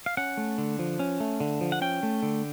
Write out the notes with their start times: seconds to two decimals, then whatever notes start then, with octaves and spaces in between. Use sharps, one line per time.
0.06 F5
0.17 C#4 F#5
0.37 A3
0.58 D3
0.79 F3
0.99 C#4
1.20 A3
1.40 D3
1.61 F3
1.72 F#5
1.81 C#4 G5
2.03 A3
2.23 D3